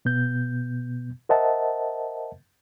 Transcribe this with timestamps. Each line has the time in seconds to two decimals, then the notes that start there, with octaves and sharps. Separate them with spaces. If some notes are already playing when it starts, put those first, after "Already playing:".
0.05 B2 B3 G6
1.29 A#4 C5 D#5 E5 F#5 A5